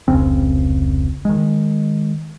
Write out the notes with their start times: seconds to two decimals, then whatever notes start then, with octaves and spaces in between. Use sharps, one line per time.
0.08 F1 C#2 C#3 C4
1.25 D#3 G#3